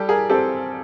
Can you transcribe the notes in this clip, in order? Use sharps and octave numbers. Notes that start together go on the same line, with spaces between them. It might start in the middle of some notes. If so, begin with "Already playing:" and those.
Already playing: G3 G4 A4
G#4 A#4
C4 G4 A4